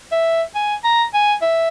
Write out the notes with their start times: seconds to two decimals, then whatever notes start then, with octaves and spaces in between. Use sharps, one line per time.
0.12 E5
0.55 G#5
0.84 A#5
1.14 G#5
1.42 E5